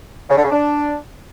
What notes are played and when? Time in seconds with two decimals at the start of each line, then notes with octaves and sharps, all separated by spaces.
0.29 C#3
0.36 D3
0.44 C#3
0.51 D4